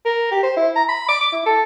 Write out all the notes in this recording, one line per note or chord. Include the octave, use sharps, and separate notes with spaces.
A#4
G4
C5
E4
A#5
B5
D6
D6
E4
A4